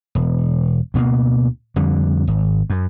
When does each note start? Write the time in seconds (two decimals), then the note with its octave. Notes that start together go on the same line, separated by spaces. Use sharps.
0.15 E1
0.94 D2 B2 F#3 A#3
1.76 F2 D3 G3
2.27 G#1
2.70 F#2